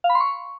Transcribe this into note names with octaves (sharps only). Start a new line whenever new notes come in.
F5
B5
C6
C#6